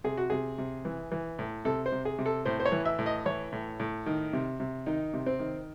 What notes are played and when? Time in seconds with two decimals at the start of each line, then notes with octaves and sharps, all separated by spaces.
0.04 C3 G#4
0.17 F#4
0.30 C3 G#4
0.58 C3
0.85 E3
1.12 E3
1.39 A2
1.65 C3 A4
1.86 C5
1.92 C3
2.05 G#4
2.19 C3
2.26 A4
2.45 A2 C5
2.60 C5
2.66 C#5
2.72 E3
2.85 E5
2.99 A2
3.06 D#5
3.25 E3 C#5
3.52 A2
3.80 A2
4.06 D#3
4.33 C3
4.60 C3
4.86 D#3 D#4
5.14 C3
5.26 C4
5.39 D#3